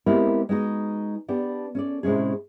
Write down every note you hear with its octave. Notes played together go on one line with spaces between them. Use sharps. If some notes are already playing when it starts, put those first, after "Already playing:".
G#3 B3 C4 E4 G4 A#4
G#3 B3 D#4 F#4
B3 D4 G4
C#4 A4 D5
A2 C3 G#3 C#4 G#4